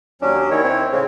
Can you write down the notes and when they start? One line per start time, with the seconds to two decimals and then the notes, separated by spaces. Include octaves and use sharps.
0.22 D#2 F#3 C#4 D4
0.51 D#3 E4 C#5
0.64 C4
0.92 A2 C#3 G#3 C4